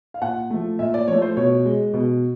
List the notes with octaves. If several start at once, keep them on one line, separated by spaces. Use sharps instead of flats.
F5
A#2 F#5
F3 A3
A#2 E5
D5
F3 A3 C#5
C5
B2 C#5
G#3
B2